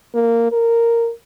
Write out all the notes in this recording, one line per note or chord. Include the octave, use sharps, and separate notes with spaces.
A#3
A#4